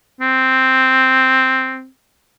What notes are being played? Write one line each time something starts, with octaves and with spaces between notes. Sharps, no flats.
C4